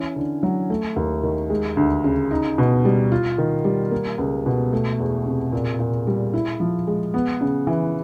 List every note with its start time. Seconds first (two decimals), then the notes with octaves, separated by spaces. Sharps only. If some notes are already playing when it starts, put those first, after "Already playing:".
Already playing: E3 C#4
0.16 D3
0.43 F#3
0.70 A3
0.96 D#2
1.23 D#3
1.50 G#3
1.77 D2
2.04 C#3
2.31 D#4
2.58 B2
2.85 G3
3.12 F4
3.38 D#3
3.64 G3
3.91 A#3
4.18 C#2
4.46 B2
4.73 A3
4.99 E2
5.26 C3
5.52 A#2
5.79 A#2
6.07 G3
6.34 E4
6.60 F3
6.87 G#3
7.14 B3
7.41 C#3
7.67 E3